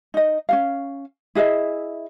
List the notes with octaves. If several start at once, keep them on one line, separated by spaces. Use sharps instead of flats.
D#4 D#5
C#4 F4 F5
E4 G#4 D#5 E5